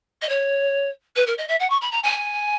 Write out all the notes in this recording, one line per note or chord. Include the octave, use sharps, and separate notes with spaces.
D#5
C#5
B4
A#4
D#5
E5
F#5
C#6
B5
A#5
G#5